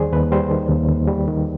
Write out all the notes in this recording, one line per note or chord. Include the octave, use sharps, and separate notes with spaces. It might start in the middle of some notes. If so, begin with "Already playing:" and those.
Already playing: D#2 D#3 G3 G#4 C5 D5
D#2 B4
G3 C5
D#3
D#2
D#2
G3
D#3